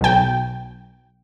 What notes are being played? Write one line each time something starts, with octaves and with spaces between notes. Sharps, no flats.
B1 G5